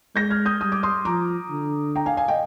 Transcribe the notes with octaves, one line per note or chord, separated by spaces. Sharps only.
G#3 G6 A#6
F6 G#6
D#6 G6
G3 D#6
D6
C6 D#6
F3 A#5 D6
D3
G5 A#5
F5 G#5
F5 G#5
D#5 G5